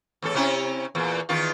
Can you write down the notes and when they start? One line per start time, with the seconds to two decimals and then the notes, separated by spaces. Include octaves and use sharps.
0.22 E2 A2 A4
0.35 C3 C#4 E4
0.95 E2 A#2
1.29 E2 D#3 F4